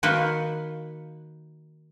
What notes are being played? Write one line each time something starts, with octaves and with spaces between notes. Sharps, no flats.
D#3 A#3 D#4 F#4 B4 C5